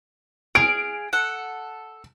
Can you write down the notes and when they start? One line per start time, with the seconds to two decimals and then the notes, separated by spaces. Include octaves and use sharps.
0.55 G#4 F5 D7
1.13 A4 F#5